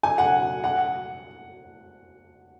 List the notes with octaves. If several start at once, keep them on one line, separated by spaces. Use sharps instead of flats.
G#5
F#5
F#5